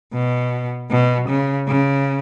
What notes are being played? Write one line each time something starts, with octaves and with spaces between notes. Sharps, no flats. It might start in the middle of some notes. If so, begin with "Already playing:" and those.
B2
B2
C#3
C#3